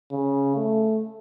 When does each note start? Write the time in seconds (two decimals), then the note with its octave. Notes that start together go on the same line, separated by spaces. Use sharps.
0.11 C#3
0.55 A3